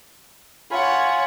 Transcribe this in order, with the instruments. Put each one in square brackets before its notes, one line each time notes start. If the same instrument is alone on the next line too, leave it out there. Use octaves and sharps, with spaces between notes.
[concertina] F4 G#5 B5 [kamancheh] C#5 F#5